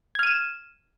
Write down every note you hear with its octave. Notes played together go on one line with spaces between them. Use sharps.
F6 G#6 D#7 E7